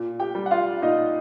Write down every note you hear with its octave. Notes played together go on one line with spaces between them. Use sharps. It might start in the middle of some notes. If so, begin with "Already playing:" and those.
Already playing: A#2
G4 G5
G3
F#5
F4 F5
A#2 D#4 D#5